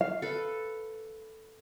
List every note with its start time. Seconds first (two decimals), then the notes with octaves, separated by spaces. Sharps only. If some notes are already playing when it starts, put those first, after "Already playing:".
0.01 F5
0.22 A4 B4